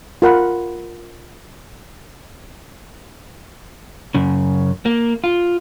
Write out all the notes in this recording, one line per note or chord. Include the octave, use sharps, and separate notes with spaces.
F4 A#4 F#5 B5
F#2 C#3
A#3
F4